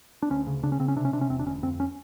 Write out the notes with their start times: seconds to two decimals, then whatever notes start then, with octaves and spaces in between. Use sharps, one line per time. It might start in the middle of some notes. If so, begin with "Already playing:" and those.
0.22 D4
0.30 D2 C#4
0.47 C#3
0.63 C#3 D4
0.72 C#4
0.80 C#3 C4
0.88 C#4
0.96 C3 D4
1.05 C#4
1.13 C3 D4
1.21 C#4
1.29 E1 C4
1.39 D4
1.46 D2 C#4
1.63 F2 C4
1.80 C#4